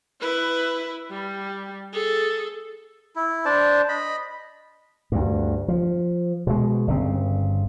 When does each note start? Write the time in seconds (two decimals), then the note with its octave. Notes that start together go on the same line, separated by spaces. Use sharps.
0.21 E4 B4
1.10 G3
1.93 G#4 A4
3.16 E4
3.45 D4 C5 D5 A5
3.89 D#5 B5
5.12 D2 G2
5.68 F3
6.47 B2 G#3
6.88 G1 C#3 C4